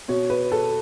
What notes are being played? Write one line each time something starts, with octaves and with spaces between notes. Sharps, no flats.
B2 C#5
B4
A4